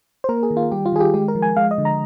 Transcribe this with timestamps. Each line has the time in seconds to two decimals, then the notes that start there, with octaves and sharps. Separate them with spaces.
0.24 C5
0.29 A#3 A#4
0.43 G#4
0.51 D#3
0.57 F4
0.72 G3 G4
0.86 F4
0.92 D#3 G#4
1.00 G4
1.14 G#3 G4
1.28 A#4
1.35 F3
1.42 G#5
1.57 G#3 F5
1.71 D#5
1.78 D3
1.85 A#5